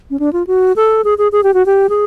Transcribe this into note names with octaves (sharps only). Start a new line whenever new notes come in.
C#4
D4
F4
F#4
A4
G#4
G#4
G#4
G4
F#4
G4
G#4